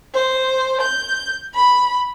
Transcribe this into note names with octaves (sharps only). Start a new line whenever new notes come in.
C5
G6
B5